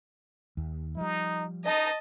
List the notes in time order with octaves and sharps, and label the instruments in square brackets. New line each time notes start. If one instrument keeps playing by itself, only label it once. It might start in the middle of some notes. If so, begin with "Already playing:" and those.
[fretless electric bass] D#2
[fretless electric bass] F3 G3 [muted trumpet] D#4
[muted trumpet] D#4 [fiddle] D#5 A5